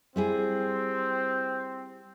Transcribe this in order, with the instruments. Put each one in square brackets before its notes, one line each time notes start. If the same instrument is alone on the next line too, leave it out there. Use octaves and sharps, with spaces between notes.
[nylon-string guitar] G3 E4 G#4 [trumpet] C4